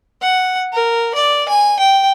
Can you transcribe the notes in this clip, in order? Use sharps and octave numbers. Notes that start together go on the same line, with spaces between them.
F#5
A#4
D5
G#5
G5